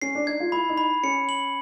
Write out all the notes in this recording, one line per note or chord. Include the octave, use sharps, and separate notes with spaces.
C#4 C7
D4
D#4 G#6
F4
E4 B5
D#4
B5
C#4 C#7
F#7